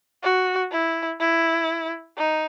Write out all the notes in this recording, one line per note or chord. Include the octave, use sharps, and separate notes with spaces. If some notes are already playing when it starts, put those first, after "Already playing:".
F#4
E4
E4
D#4